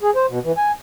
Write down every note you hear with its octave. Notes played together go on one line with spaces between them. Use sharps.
G#4
C5
B2
E3
G#5